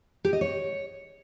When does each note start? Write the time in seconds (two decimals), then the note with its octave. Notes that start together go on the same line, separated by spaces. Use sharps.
0.25 G4
0.33 D#5
0.41 C#5